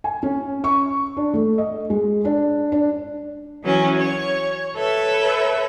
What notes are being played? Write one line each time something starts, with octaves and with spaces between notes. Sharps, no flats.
G#5
C#4
C#6
D4
A3
D#5
G#3
D4
D4
E3 F#3 C#4
C#5
A4 B4 C#5 E5